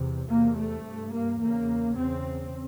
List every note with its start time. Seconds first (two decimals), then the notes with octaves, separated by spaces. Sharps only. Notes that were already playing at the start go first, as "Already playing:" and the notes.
Already playing: E2 C3
0.29 E2 C3 A#3
0.57 A3
0.86 G2
1.13 A#3
1.41 E2 C#3 A#3
1.97 E2 C#3 C4